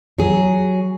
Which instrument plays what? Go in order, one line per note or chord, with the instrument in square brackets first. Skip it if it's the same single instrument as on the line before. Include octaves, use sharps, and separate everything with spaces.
[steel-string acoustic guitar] F#3 G#4